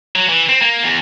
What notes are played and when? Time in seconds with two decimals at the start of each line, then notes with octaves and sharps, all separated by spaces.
0.16 F#3
0.29 E3
0.49 C4
0.62 A#3
0.83 E2